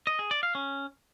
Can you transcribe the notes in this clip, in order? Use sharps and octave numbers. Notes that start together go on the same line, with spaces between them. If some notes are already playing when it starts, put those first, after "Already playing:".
D#5
G#4
D5
F5
C#4